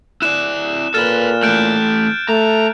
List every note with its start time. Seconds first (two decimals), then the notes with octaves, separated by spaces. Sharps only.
0.22 E4 D5 F#6 E7
0.94 A#2 A4 B4 F6 A6 E7
1.43 E3 A3 F#6 G6 D7
2.29 A3 A#5